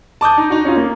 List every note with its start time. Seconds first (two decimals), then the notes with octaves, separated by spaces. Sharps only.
0.21 A5 D6 D#6 G6
0.38 D#4
0.50 D#4 F#4
0.65 C#4 D#4 F4
0.77 A#3